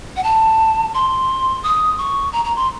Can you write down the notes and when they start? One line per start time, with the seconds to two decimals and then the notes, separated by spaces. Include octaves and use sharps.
0.16 F#5
0.24 A5
0.94 C6
1.63 D#6
1.98 C#6
2.33 A#5
2.45 A#5
2.56 C6